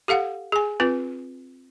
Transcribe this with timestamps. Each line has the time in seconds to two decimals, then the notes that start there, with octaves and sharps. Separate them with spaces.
0.08 G4 A4 F5 F#5
0.52 G#4 G#5
0.80 C4 F4 B4